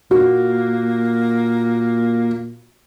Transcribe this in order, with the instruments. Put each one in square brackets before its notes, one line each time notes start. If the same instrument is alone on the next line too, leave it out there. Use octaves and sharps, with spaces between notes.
[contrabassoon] A#2 [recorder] A#3 [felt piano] F#4